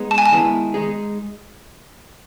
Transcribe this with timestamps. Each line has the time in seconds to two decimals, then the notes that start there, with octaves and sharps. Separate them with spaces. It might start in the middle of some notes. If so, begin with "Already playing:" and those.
Already playing: G#3 B3 D#4 G#4
0.11 A5
0.18 G#5
0.26 A5
0.32 D#3 G#3 B3 E4
0.74 G#3 D#4 G#4